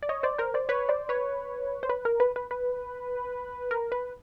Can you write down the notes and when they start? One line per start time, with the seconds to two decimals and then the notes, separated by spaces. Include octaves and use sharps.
0.03 D5
0.09 C#5 D#5
0.23 C5 D5
0.38 A#4 C5
0.54 C5 D5
0.69 B4 C#5
0.89 C5 D5
1.09 B4 C#5
1.83 C5
1.89 B4
2.05 A#4
2.20 B4
2.36 B4
2.51 B4
3.71 A#4
3.92 B4